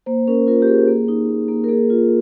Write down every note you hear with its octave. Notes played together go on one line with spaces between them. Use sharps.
A#3 C5
C#4 A#4
F4 A#4
G4
A#3 G#4
A#3
D#4
A#3
A#3
A#4
A#3 G#4
F4